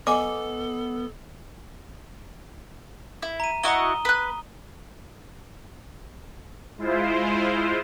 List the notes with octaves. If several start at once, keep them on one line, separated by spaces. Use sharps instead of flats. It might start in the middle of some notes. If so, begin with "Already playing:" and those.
B3 A4 D#5 G#5 D6
E4
A#5 D#7
E4 F#4 D#5 A#5 D#6 G7
B4 F#6
G#3 E4 F4 C5